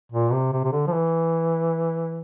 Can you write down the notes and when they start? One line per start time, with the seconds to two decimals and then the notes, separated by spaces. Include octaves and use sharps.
0.12 A#2
0.32 C3
0.52 C3
0.64 C3
0.72 D3
0.87 F3
0.93 E3